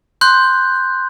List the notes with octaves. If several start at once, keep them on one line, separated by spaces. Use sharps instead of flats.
C6 F#6 G6